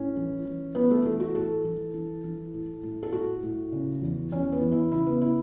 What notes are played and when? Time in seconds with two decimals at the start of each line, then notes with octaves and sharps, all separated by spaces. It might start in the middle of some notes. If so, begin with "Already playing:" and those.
Already playing: A2 C#4
0.16 E3
0.45 E3
0.75 E3 B3
0.91 A3
1.06 E3 A3
1.20 F#4
1.35 A2 A4
1.64 E3
1.94 E3
2.24 E3
2.54 A2
2.83 A2
3.03 A4
3.12 A2 F#4
3.43 A2
3.72 C#3
4.02 E2
4.31 E2 C#4
4.52 B3
4.61 E2
4.72 E4
4.91 C#3 E4
5.07 B3
5.21 E4